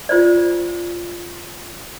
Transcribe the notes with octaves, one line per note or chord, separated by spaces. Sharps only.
F4 C5 D5